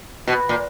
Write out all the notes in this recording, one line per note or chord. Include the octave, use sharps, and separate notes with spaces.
B2
A#2